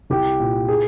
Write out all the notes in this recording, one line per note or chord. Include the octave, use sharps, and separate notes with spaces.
C2 G4
A#2
G#4